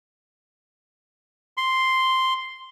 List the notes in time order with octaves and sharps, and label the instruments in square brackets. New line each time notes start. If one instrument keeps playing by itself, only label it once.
[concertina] C6